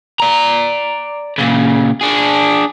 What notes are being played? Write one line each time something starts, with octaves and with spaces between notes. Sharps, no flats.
D5 A#5
A#2 C#3
D4 G#4